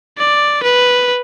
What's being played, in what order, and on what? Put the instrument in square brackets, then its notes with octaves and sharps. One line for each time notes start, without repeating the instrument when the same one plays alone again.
[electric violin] D5
B4